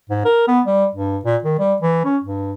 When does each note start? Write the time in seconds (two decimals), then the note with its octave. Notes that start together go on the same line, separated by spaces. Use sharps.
0.10 G#2
0.25 A#4
0.48 B3
0.66 G3
0.95 G2
1.25 A#2
1.44 D#3
1.59 G3
1.82 E3
2.05 C#4
2.24 G2